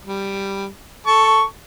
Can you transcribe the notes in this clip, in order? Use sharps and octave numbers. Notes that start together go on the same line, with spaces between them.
G3
A4 A5 C#6